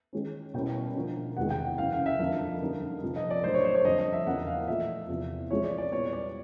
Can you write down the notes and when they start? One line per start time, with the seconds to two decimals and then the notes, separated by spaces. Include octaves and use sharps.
0.13 D#3 G#3 C#4
0.54 B2 G3 A#3 C#4 E4 G5
0.96 D3 F3 A#3
1.37 E2 C3 D#3 G#3 F#5
1.50 G5
1.64 F#5
1.78 F#2 C#3 E3 F5
1.93 F5
2.06 E5
2.19 F2 D3 F3 A#3 F5
2.61 F#2 D3 G3 A#3 D#4
3.02 F2 C3 F3 A#3
3.16 D#5
3.30 D5
3.44 A2 F#3 A#3 D4 C5
3.54 C#5
3.65 C5
3.75 C#5
3.85 F2 D3 G3 D#5
3.99 D#5
4.13 E5
4.26 E2 C#3 F3 A#3 F#5
4.47 F5
4.67 A#2 F3 A3 E5
5.09 E2 C3 F3
5.51 F3 G#3 C4 C#5
5.64 D5
5.78 D5
5.92 A#2 G3 B3 E4 G4 C#5
6.13 D5